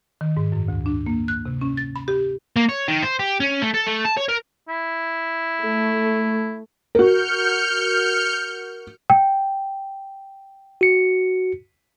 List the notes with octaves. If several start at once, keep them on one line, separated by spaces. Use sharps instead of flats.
D#3
G#2
F#2
D2
D4
A#3
F#6
C3
C#4
A6
B5
G4
A#3
C#5
D#3
C5
G4
C#4
A3
A4
A3
A5
C#5
A#4
E4
A3
F#4 A#4 F6 G6 C#7
G5
F#4 C#7